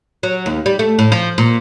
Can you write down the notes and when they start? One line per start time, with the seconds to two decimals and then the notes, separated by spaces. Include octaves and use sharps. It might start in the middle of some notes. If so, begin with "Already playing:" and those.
0.23 F#3
0.46 D#2
0.66 G3
0.79 A3
0.99 A2
1.12 F3
1.38 A#2